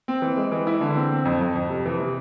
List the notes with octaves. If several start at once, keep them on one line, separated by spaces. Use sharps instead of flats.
C4
E3
G#3
E3
E4
D3
C4
C4
F2
F2
F2
C3
E3
C3